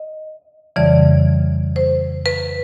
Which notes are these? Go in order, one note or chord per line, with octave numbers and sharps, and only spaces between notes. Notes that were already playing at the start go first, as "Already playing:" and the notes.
Already playing: D#5
F2 C#3 E3 G3 D5
C5
B4